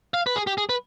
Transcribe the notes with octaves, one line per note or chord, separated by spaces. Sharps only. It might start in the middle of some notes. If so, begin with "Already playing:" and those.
F5
B4
G#4
G4
G#4
B4